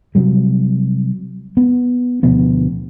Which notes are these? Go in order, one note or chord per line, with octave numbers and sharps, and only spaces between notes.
C3 F#3 G3
B3
D2 B2 F3 B3